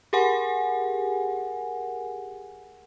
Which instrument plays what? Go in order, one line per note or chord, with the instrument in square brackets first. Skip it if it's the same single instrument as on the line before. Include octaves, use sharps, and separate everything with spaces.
[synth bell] G4 G#4 A#4 F#5 G#5